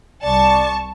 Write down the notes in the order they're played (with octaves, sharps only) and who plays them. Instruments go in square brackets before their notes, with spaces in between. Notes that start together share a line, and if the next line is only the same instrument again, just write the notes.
[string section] C2 A5 C#6 [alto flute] D5